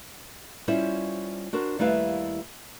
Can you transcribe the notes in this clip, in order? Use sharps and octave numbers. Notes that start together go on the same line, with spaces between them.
G3 C#4 E4 F4 C5
D4 F#4 A#4 C5
D#2 G3 A3 E4 B4 F5